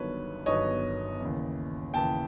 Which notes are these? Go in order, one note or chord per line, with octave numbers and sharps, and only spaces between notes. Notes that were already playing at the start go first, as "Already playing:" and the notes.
Already playing: G1 G2 D#3 F#3 B3 B4 C#5
G1 G2 D#3 F#3 B3 C#5 D#5
D#2 C#3 E3
D#2 C#3 E3 G5 A5